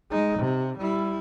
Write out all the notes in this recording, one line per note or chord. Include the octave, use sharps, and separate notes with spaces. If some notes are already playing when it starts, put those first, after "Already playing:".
G#3 D#4
C3
G3 E4